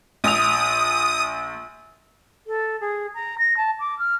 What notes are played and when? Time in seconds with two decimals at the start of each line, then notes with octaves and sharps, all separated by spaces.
0.24 A#1 D#6 F7
2.47 A4
2.80 G#4
3.14 A#5
3.38 A#6
3.57 A5
3.79 D6
3.98 F6